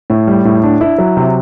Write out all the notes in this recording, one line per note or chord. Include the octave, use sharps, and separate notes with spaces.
A2
G3
A2
D4
E4
F#3
C3